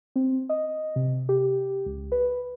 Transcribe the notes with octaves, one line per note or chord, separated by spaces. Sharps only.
C4
D#5
C3
G4
C#2
B4